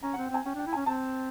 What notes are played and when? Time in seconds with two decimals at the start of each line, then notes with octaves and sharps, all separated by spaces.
0.03 C#4 A#5
0.13 C4 F#5
0.24 G5
0.31 C4 G#5
0.45 C#4 G5
0.55 D4
0.59 G5
0.67 E4
0.73 C#4 G#5
0.86 C4 A5